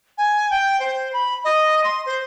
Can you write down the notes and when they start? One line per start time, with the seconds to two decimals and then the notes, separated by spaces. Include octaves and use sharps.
0.18 G#5
0.50 G5
0.80 C5
1.13 B5
1.45 D#5
1.84 C6
2.06 C5